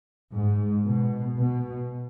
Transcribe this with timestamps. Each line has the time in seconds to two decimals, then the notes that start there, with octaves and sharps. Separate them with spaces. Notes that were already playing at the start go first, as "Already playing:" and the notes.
0.32 G#2
0.84 B2
1.36 B2